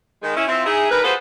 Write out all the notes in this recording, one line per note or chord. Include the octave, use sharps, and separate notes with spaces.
D#3 G#3
C#4 E4
C4 E4 F4
D#4 E4 G#4
G2 D#4 A#4 B4
F4 F#4 G#4 A4 B4 C5